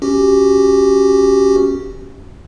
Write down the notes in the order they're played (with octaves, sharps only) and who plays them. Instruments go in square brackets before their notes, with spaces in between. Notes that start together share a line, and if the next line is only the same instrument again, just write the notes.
[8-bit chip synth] C#4 F#4 G4